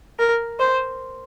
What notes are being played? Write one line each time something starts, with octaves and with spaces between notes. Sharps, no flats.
A#4
C5